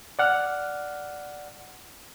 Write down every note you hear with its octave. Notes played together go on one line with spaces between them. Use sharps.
D5 F#5 F6